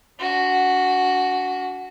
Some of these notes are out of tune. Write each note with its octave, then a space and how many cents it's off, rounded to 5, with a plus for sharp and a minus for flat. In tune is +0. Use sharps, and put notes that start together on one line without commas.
D4 -45 F#4 +0